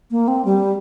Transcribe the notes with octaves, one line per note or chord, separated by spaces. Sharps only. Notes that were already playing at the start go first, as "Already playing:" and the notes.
A#3
C4
G3